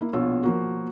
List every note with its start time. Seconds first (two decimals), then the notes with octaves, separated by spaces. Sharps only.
0.01 A#3 E4
0.13 A#1 B2 F4 C#5 E6
0.43 F3 A#3 F#4